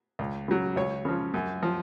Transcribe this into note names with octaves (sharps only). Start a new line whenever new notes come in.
C#2
C#3 F#3
C#2 C#5
C#3 F3
F#2
F3